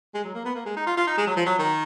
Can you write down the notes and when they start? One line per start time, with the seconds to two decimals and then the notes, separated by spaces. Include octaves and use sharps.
0.14 G#3
0.24 F#3
0.35 A#3
0.45 B3
0.55 A#3
0.66 G#3
0.77 D#4
0.87 F4
0.97 F4
1.07 D#4
1.18 G#3
1.27 F#3
1.37 F3
1.46 F#3
1.59 D#3